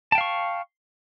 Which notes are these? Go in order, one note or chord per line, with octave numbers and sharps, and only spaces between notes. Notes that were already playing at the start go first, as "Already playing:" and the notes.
F5 G5 A5 C#6